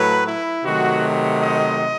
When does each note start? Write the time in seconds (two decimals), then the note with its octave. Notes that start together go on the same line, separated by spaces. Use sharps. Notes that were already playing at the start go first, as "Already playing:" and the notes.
Already playing: A2 F#3 A3 B4
0.26 E4
0.65 C3 D#3 F#3 A3 F#4
1.42 D#5